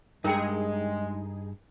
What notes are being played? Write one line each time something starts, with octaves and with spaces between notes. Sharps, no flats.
G2 G#3 D#4 G#4 A#4 G5